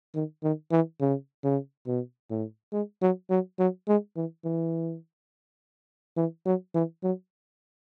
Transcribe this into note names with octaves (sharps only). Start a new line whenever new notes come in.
D#3
D#3
E3
C#3
C#3
B2
A2
G#3
F#3
F#3
F#3
G#3
E3
E3
E3
F#3
E3
F#3